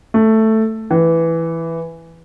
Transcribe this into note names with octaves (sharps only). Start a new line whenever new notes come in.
A3
E3